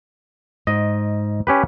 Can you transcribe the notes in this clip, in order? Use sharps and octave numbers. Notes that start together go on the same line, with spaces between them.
G#2 D#5
C#4 G4 B4